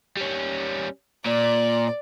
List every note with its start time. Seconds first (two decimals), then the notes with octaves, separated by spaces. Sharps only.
0.17 G3 C#4
1.26 A#2 D5